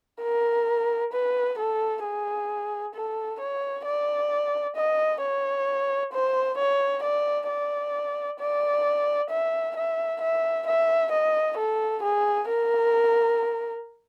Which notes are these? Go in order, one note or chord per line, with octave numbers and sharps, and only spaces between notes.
A#4
B4
A4
G#4
A4
C#5
D5
D#5
C#5
C5
C#5
D5
D5
D5
E5
E5
E5
E5
D#5
A4
G#4
A#4